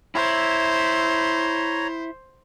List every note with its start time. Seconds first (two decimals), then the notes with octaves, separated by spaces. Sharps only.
0.15 E4 C5 C#5 A#5